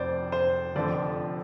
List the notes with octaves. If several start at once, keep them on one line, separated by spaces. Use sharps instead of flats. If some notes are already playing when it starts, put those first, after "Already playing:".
Already playing: F1 F2 C5 D5
C5
F1 F2 D3 F3 D5